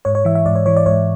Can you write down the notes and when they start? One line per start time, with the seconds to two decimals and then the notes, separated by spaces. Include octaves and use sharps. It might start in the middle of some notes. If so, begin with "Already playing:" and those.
0.05 G#2 C#5
0.15 C#5
0.25 E3 E5
0.35 E5
0.46 G#2 D5
0.55 C#5
0.66 E3 C#5
0.76 D5
0.86 G#2 C#5